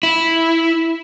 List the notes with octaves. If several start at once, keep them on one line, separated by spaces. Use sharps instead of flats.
E4